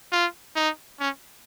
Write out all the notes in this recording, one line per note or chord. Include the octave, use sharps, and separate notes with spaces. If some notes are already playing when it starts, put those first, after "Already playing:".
F4
D#4
C#4